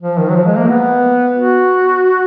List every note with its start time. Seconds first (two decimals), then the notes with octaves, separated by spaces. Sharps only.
0.02 F3
0.19 D#3
0.29 F#3
0.35 F3
0.46 G#3
0.58 A#3
0.69 B3
1.37 F#4